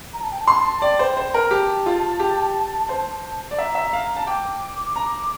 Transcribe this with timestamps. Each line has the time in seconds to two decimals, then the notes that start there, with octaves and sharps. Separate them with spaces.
0.13 A#5
0.22 A5
0.31 G5
0.41 A5
0.47 C6
0.82 D5 G5
0.99 C5
1.17 C5
1.34 A#4
1.51 G4 A5
1.86 F4
2.20 G4
2.89 C5
3.51 D5
3.58 E5 A#5
3.75 E5
3.93 F5
4.17 A5
4.27 G5 D6
4.96 A#5